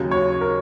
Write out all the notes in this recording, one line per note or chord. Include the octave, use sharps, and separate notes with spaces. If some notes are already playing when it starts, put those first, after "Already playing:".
Already playing: D#2 C#3 F#3
C#5
A#4